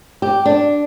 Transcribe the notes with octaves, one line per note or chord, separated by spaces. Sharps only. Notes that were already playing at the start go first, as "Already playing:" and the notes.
G4
D4